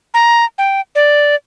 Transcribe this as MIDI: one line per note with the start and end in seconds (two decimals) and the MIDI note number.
0.14 0.45 82
0.58 0.81 79
0.95 1.35 74